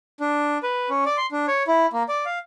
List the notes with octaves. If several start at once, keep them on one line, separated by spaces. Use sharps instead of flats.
D4
B4
C#4
D5
C6
D4
C#5
E4
A#3
D5
F5